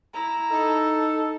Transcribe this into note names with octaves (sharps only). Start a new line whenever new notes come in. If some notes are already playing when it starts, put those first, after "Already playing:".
E4 A#5
D#4 A4